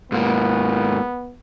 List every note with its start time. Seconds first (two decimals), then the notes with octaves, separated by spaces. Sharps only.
0.12 G#2 A#3 B3